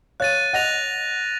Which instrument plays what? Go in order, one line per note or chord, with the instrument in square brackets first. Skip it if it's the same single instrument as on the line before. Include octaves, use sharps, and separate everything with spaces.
[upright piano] C#5 F5 [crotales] F#6 A6 D#7
[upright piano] D#5 F#5 [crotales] F#6 A#6 F7